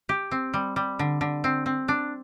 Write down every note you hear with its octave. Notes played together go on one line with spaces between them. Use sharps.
G4
C4
G3
G3
D3
D3
C4
C4
D4